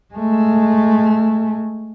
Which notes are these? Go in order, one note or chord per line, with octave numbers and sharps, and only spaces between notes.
G#3 A3